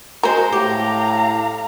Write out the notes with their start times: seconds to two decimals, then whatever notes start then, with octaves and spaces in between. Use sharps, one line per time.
0.23 G#3 F#4 A#4 C5 C6
0.52 A2 G4 F5 A#5